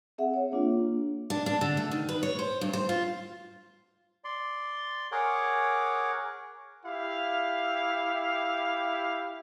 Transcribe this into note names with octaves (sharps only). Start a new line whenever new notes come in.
C4 G#4 E5 F#5
C#5
A#3 D4 F4
D4
D4
D3
A3
D#3
B4
C#5
C5
G2
C5
F4
D5 C6
G#4 A#4 C#5 F#5 D6
E4 G4 F5